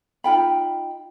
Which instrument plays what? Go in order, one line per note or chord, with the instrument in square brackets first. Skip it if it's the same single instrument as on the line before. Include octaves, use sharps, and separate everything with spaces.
[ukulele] D#4 F4 G5 B5